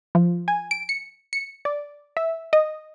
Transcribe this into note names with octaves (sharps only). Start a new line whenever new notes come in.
F3
G#5
D7
C#7
C#7
D5
E5
D#5